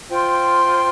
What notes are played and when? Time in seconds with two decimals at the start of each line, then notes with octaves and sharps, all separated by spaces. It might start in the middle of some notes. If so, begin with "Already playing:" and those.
0.09 F4 C5 G5 C6